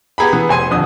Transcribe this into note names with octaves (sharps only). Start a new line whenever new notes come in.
B3 G4 G#4 A#5 B5
E3 B3 G#4
F1 G#5 C6 D#7
D#1 F2 D3 D#6